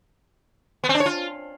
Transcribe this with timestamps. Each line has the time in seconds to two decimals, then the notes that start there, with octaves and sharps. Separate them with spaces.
0.84 B3
0.89 C4
0.95 D4
1.00 C#5
1.06 F4